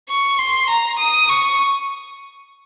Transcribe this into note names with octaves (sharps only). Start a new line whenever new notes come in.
C#6
C6
A#5
D#6
C#6